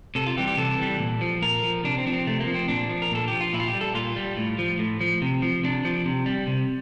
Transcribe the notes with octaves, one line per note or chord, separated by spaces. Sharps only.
C3 A4
F4
E3 G3 G4
G4
C3 A4
E3 G3
A#2
F3
A#2 A#4
F3
C3 D4
C4
F3 D4
C4
C3 A3
A#3
F3
C4
A#2 D4
F3
A#4
A#2 A4
F3 G4
F4
A#2 E4
F4
G4
G3
A4
A#2 F4
G3
A2
F3
A2
F3
C3
F3
C3 D4
F3
C3
G3
C3